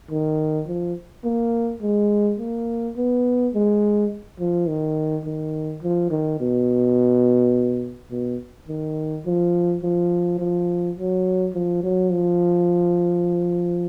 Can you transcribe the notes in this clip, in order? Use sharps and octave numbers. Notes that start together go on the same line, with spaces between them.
D#3
F3
A#3
G#3
A#3
B3
G#3
F3
D#3
D#3
F3
D#3
B2
B2
D#3
F3
F3
F3
F#3
F3
F#3
F3